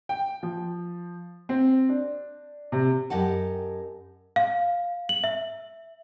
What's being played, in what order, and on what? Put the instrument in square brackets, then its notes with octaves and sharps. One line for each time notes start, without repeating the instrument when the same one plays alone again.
[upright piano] G5
F3
C4
D4
C3
[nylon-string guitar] F#2 G4 D#5 F#5 A5
[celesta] F5
F#7
E5